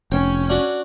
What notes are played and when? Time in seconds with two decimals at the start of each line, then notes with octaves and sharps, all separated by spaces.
0.12 F1 C#4 G5
0.49 D4 F#4